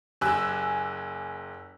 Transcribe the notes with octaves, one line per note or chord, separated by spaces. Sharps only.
F#1 G4 G#5 E6 F#6